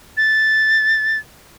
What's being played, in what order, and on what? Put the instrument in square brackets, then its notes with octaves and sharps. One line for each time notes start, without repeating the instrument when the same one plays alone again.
[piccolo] A6